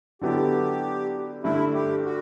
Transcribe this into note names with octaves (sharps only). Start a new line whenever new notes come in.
D3 F#3 B3 E4 G4 A4
G2 D3 A3 E4
G4
F#4